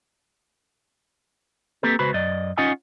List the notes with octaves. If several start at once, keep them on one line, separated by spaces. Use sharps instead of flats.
A#3 C4 G4 A4 B4
C#2 F#4 B4 C5 B5
F#2 D5 D#5
C#4 D#4 F4 D#5 F#5 G#5